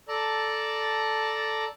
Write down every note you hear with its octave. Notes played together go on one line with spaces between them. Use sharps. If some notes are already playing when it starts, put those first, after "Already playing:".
A4 D5 A5 A#5